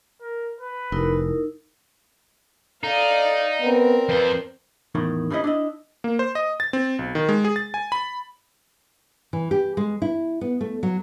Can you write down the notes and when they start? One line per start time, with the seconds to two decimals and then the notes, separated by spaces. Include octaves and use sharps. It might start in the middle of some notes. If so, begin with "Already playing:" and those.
0.22 A#4
0.61 B4
0.92 F1 D#4 E4 A#4
2.84 D#4 A4 D5 F5
3.61 B3 C4 A#4
4.09 F2 B4 C5
4.95 E2 A2 D#3
5.30 G2 G3 B3 C#4 E4 D#5
5.44 D4 E4 D#5
6.04 A#3
6.19 C5
6.35 D#5
6.60 A6
6.73 C4
6.99 B1
7.15 D#3
7.29 G#3
7.44 G#4
7.56 A6
7.74 G#5
7.92 B5
9.33 E3
9.51 G4
9.77 G#3
10.02 E4
10.41 B3
10.61 A3
10.83 F#3